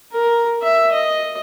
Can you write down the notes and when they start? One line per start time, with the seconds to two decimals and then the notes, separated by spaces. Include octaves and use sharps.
0.12 A#4
0.62 E5
0.92 D#5